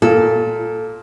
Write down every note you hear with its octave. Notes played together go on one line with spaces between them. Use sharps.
A#2 A4